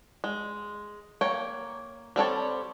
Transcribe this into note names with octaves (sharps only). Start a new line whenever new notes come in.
G#3
A#3 C#5 G5
G3 C4 A4 C#5